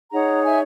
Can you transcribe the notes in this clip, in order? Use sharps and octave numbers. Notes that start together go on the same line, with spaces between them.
D#4 G#4 C#5 F#5 A#5
E5 G#5